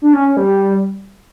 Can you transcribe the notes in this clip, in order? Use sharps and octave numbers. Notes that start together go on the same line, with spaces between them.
D4
C#4
C#4
G3